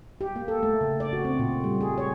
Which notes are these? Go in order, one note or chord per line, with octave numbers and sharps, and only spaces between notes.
G4
A#3
A4
A3
C#3
D5
F#4
C4
A#2
G3
G#4
C#5